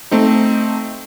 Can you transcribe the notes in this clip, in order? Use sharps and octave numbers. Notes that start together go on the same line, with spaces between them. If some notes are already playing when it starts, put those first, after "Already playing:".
A3 C4 D#4